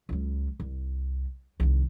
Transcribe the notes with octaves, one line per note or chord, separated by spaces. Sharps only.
C#2 F#3
C2
C2 D#3